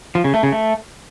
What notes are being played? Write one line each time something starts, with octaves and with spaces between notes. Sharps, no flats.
F3
C#3
A3
C#3
A3